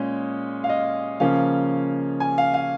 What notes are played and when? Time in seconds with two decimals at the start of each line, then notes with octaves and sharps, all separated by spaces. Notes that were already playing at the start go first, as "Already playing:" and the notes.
Already playing: A#2 G#3 C#4
0.64 F5
0.69 D#5
1.20 C#3 F3 A#3 C#4 F5
2.20 G#5
2.38 F5
2.54 F5